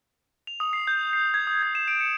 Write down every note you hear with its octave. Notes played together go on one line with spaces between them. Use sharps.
F7
D#6
C7
G6
C7
G#6
D#6
G#6
E7
D7
C#7